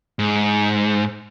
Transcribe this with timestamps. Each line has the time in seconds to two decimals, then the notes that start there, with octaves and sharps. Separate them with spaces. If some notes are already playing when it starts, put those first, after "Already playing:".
0.19 G#2